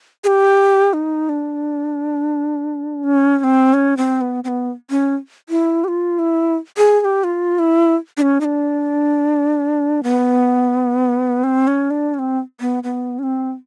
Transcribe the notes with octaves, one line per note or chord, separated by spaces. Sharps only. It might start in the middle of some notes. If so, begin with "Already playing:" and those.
G#4
G4
D#4
D4
C#4
C#4
C4
C#4
C4
B3
C4
B3
C#4
E4
G4
F4
E4
G#4
G#4
G4
F4
E4
D4
C#4
D#4
D4
B3
C4
C#4
D4
C#4
C4
B3
B3
C#4
C4